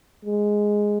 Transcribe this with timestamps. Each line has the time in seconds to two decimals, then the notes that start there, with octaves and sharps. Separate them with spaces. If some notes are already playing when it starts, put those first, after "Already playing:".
0.25 G#3